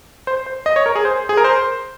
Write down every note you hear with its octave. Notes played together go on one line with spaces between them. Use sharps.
C5
C5
D#5
C#5
A#4
G#4
C5
G#4
A#4
C5